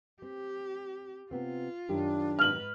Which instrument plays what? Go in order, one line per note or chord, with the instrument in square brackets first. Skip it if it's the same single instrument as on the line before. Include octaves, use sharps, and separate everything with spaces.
[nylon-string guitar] C4 [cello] G4
[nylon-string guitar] C3 B3 C4 [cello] F4
[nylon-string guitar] F#2 D#3 G4 [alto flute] D4
[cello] G#2 B4 [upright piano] F6 F#7